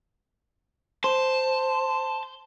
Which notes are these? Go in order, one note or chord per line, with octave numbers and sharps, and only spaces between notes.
C5 A5